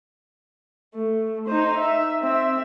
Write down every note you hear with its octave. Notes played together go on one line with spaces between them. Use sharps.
A3
D#4 C5
E5
C4 E5